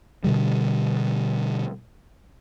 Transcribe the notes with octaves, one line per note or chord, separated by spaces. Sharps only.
B2 D3 G3